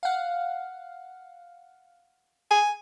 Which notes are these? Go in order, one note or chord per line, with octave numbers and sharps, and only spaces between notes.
F5 F#5
G#5